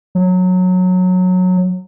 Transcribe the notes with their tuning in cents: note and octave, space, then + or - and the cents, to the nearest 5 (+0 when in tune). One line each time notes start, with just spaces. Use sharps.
F#3 -15